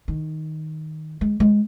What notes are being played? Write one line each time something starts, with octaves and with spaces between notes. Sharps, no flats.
D#3
G#3
G#3